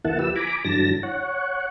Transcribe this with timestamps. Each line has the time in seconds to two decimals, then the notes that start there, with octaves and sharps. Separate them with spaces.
0.05 D2 E3 A#3 E4 F#5 A5
0.19 F3 G4 B4 E6
0.36 G#5 A#5 B5 D6
0.65 G2 D3 E3 F#3 A5 A#6
1.03 C#5 F#5